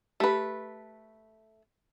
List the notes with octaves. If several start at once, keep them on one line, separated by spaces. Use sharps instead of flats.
A3 G4 B4